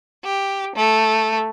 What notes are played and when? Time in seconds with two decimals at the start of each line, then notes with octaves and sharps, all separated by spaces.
0.24 G4
0.76 A3